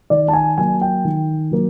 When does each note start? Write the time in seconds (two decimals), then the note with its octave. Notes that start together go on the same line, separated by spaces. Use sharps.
0.10 D#3 D5
0.28 A5
0.33 G#5
0.58 F#3 A#3 G#5
0.81 G5
1.05 D#3
1.51 F#3 A#3